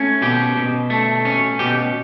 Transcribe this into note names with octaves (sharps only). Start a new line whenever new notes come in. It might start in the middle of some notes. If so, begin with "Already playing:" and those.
Already playing: A3 C#4
B2 G4
B2
A3
C#4
B2 G4